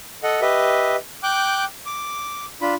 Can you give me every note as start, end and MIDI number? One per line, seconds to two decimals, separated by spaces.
0.23 0.41 69
0.23 0.41 75
0.23 0.41 78
0.41 0.96 67
0.41 0.96 71
0.41 0.96 75
0.41 0.96 76
1.23 1.64 79
1.23 1.64 86
1.23 1.64 90
1.23 1.64 91
1.86 2.45 86
2.62 2.74 62
2.62 2.74 65
2.62 2.74 83